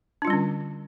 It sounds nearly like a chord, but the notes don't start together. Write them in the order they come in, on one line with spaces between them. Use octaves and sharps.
D4 F4 G3 C#4 D3